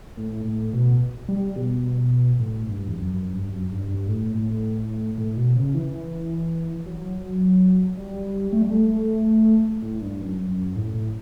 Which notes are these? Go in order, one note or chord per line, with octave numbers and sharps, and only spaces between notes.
A2
A2
B2
G3
B2
A2
G2
E2
F#2
F#2
G2
F#2
G2
G2
A2
A2
A2
B2
C#3
E3
F#3
G3
A3
G3
A3
A2
G2
F#2
F#2
A2
A2